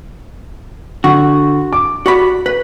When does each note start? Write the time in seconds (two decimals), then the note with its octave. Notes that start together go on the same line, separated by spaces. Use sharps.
1.04 D3 F#4
1.73 D6
2.06 F#4 D5 B5
2.46 B4